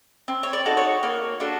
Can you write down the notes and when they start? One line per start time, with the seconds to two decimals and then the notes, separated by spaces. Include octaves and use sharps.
0.28 C4
0.43 C#5
0.53 D5
0.66 D#4 F#4 A4
0.77 C#5
1.03 A#3 C#5
1.40 D4 F#4 A4